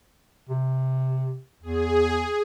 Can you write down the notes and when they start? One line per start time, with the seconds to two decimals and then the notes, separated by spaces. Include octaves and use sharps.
0.49 C3
1.63 E2 G#4